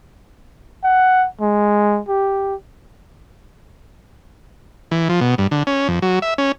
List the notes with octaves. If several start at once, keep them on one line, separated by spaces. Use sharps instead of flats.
F#5
G#3
G4
E3
F3
B2
G2
D3
C#4
F2
F#3
E5
C#4